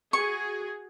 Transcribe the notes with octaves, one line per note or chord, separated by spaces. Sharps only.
F#4 G#4 C#6